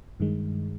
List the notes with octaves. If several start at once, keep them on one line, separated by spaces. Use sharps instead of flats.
G2 D#3 G#3